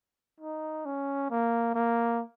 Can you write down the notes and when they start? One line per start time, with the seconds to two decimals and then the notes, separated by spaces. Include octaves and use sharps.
0.40 D#4
0.86 C#4
1.30 A#3
1.75 A#3